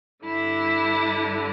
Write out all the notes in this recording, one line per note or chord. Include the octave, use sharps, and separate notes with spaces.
G2 D3 E4